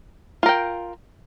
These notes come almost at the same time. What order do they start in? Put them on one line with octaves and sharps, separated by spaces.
F4 A#4 G5